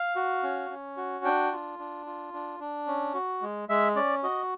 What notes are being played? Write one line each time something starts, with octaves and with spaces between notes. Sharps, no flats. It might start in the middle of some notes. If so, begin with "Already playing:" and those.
Already playing: F5
F#4
C#4
C#4
F#4
D4 G5
F4
D4
F4
D4
D4
C#4
F#4
G#3
G#3 E5
C#4 D5
F#4 D#5